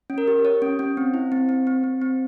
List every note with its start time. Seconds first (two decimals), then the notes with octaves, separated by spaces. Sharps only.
0.10 C#4
0.18 A#4
0.28 G4
0.45 G4 C#5
0.62 C#4
0.79 C#4
0.97 C4
1.14 E4
1.32 C4
1.49 C4
1.67 C4
1.84 C4
2.02 C4